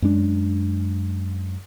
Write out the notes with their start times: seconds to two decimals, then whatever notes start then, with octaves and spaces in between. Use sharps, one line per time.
0.02 F#2 G#3 D4